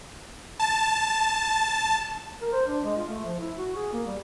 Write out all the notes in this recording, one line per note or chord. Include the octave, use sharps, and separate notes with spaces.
A5
A#4
C5
D4
G#3
F4
A3
F3
E4
F#4
G#4
A#3
G3